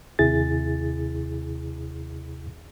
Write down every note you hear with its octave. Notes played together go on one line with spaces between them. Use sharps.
D#2 C3 E4 G#4 A6